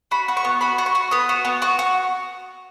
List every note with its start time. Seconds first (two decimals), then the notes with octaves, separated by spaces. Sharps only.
0.11 F#4 B5
0.28 F#4
0.37 C#6
0.44 B3
0.61 F#4 B5
0.78 F#4
0.86 C#6
0.95 F#4
1.11 B3 D#6
1.29 F#4
1.45 B3
1.62 F#4 C#6
1.79 F#4